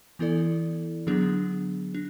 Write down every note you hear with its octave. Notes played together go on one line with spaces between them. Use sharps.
E3 B3 E4 A4 D5
D3 F#3 B3 D4 G#4
D4